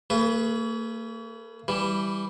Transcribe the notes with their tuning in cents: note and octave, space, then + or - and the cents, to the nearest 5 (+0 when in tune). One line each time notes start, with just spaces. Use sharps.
A#3 -45 G#4 +20 B4 -5
E3 +0 G3 +0